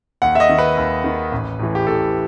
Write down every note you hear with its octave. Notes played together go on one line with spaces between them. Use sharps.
D#2 F#5
E5
D#5
D#3
B4
D#2
D#3
A1
A2 E3
G4
A1 A4